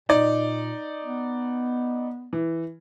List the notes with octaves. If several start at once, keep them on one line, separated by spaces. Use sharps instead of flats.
A#2 D#4 D5
B3
E3